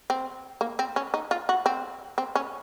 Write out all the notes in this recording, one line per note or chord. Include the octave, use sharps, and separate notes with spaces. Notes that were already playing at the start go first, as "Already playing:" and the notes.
C4
A#3
C4
C#4
D#4
F4
F#4
C4
C4
C#4